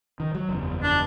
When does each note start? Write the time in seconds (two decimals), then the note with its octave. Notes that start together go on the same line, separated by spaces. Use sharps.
0.20 D#3
0.35 F#3
0.49 F#1 E2
0.83 D4